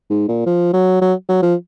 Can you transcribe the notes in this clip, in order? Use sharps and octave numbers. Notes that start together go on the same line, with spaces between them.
G#2
A#2
F3
F#3
F#3
F#3
F3